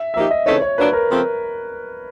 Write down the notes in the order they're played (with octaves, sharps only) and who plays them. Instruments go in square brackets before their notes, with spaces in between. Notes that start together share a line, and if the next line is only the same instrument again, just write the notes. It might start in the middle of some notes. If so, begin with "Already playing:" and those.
Already playing: [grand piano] E5
[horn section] F3 A#3 D#4 G4 [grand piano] E5
[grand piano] D#5
[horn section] C#3 E3 A3 C4 D#4 [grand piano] C#5
[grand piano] C#5
[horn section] A#2 F#3 A#3 D4 [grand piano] B4
[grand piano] A#4
[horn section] C#3 F3 A3 C4